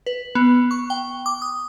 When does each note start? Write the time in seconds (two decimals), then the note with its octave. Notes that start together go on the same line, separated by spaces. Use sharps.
0.06 B4
0.35 B3
0.71 C#6
0.90 G5
1.26 D6
1.42 D#6